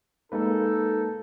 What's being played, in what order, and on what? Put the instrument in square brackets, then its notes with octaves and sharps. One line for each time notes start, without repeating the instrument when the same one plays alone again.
[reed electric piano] G#3 A#3 B4 [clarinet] D#4 [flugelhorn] A4